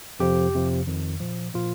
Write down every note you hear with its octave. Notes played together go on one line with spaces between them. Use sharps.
F2 C3 F3 G4
F2 C3 F3
F2 D#3
A#2 F3
A#2 F3 F4